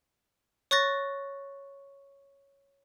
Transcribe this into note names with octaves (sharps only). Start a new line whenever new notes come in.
C#5 C#6 F#6 A6 A#6